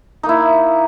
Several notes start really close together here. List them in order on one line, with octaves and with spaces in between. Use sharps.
D#4 A#3 E4